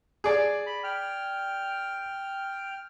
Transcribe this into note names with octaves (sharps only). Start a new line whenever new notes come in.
G#4 D5
B5
G5 F6